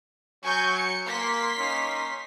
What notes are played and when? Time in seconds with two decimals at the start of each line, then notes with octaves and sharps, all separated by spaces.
0.44 F#3 G#5 C#6 G6
0.75 C#7
1.07 A#3 C6 B6
1.58 A#3 C#4 D#4